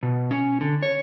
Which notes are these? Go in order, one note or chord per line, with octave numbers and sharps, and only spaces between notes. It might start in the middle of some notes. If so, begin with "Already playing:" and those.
B2
C#4
D3
C#5